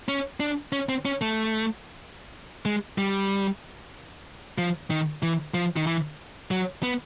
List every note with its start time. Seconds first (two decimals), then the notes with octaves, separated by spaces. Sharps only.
0.08 C#4
0.40 D4
0.72 C#4
0.89 C4
1.05 C#4
1.21 A3
2.65 G#3
2.98 G3
4.58 F3
4.90 D#3
5.23 E3
5.54 F3
5.76 D#3
5.87 E3
6.51 F#3
6.83 B3